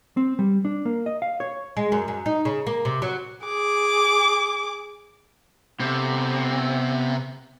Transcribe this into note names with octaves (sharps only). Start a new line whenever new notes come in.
C4
G3
D4
A#3
D#5
F5
C#5
G#3
F#2
F#2
D#4
C#3
A#3
C3
F#3
G#4 D6
C3 B3 G4 A4